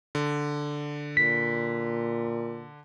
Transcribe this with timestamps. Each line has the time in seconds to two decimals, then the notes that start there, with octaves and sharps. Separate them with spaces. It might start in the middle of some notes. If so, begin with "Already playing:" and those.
0.15 D3
1.17 A#2 B6